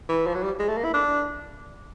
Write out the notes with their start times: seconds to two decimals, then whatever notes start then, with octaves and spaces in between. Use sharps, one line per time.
0.09 E3
0.26 F3
0.35 F#3
0.43 G3
0.59 G#3
0.68 A3
0.77 A#3
0.84 E4
0.94 D4